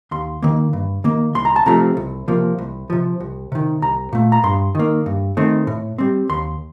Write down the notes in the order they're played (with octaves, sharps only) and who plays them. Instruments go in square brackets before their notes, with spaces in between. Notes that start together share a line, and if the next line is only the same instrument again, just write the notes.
[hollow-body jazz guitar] D#2 C6
D#3 A#3
G2
D#3 A#3
C2 C6
A#5
A5
C3 F3 A3 C4 A#5
C2
C3 F3 A#3
C2
C3 F3
C2
C3 D#3
C2 A#5
A#2 A3
A#5
G2 C6
D#3 A#3
G2
D#3 A3 C4
A2
G3 C4
D#2 C6